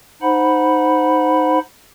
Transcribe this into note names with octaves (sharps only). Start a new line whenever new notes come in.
D#4 C5 F#5 B5